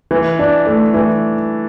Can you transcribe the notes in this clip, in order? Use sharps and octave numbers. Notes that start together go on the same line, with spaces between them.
E3
D4
A3
E3